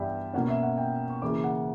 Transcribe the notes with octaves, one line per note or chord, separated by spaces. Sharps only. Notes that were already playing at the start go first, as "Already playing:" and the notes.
Already playing: G2 E3 G3 B3 D5 E5 G5
B2 A#3 C#4 F#5
E5
F#5
G5
C#6
C#3 E3 A#3 C#4 D6
F#5